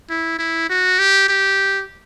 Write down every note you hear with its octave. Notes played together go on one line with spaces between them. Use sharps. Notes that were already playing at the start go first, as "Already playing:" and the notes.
E4
E4
F#4
G4
G4